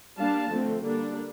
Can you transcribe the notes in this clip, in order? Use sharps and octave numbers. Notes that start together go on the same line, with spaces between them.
G3 A#3 D4 F5 A5
D3 F3 A3 C4
D3 G3 A#3 D4